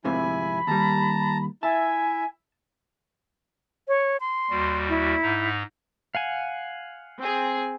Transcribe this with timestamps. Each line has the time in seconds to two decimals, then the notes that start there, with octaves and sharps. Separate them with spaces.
0.05 F2 G#2 C3 E4 G#5 B5
0.67 D#2 G3 A5 A#5
1.63 E4 E5 G#5 A5
3.88 C#5
4.20 C6
4.50 D#2 G3 F#4
4.89 E4
5.22 G#2 D#4
6.15 F5 F#5 G#5
7.18 C4 G#4